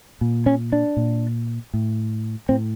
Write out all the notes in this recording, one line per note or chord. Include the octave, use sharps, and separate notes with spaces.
A#2
C#4
D4
A#2
A2
A2 C4